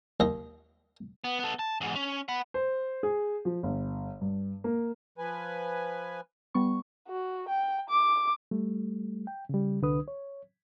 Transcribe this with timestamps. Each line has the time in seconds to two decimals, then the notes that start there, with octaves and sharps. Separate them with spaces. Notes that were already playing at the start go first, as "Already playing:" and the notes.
0.20 D#2 D#5
1.24 B3
1.40 B3 A4
1.59 A5
1.81 E2 G#2
1.95 C#4
2.28 F#5 B5
2.54 C5
3.03 G#4
3.45 F3
3.63 G1
4.21 G2
4.64 A#3
5.18 F3 B4 G#5
6.54 G3 B3 C#6
7.08 F#4
7.49 G5
7.90 D6
8.51 G3 A3
9.27 G5
9.49 C#3 G3
9.82 C2 D3 D4 B4 D#6
10.08 C#5